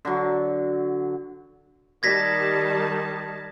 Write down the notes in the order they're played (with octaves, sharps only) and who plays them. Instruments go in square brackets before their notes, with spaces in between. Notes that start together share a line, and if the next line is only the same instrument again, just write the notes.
[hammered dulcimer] D3 F#3
[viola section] D#3 G3 A5 [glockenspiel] G#6 A#6 B6